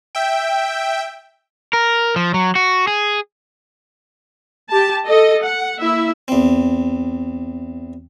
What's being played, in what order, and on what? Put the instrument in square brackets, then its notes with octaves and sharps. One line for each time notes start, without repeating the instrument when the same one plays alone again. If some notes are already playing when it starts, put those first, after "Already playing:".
[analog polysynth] E5 G5
[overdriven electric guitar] A#4
F3
F#3
F#4
G#4
[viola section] G4 A5
A4 D#5
F#5
A#3 E4 E5
[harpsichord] E2 C4